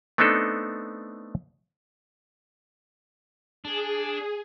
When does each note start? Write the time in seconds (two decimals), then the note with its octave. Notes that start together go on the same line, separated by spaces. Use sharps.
0.18 A3 B3 C4 D4 D#4 A4
3.65 D4 G#4